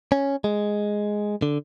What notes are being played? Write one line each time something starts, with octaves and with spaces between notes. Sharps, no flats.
C#4
G#3
D3